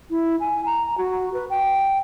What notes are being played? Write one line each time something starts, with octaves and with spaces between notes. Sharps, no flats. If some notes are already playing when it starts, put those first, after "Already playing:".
E4
G#5
A#5
F#4
B4
G5